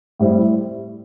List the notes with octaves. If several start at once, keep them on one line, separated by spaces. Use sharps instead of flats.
A2 G3 C4 E4